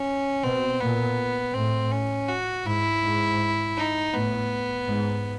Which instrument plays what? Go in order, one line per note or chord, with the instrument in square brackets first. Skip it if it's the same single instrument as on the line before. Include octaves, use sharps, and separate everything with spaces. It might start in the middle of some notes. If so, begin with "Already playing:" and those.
Already playing: [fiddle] C#4
[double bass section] B2 [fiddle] C4
[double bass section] A#2 [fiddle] B3
[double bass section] A2 [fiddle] C4
[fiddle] C#4
F#4
[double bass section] G#2 [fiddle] E4
[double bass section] G#2
[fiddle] D#4
[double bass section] A2 [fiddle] B3
[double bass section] G#2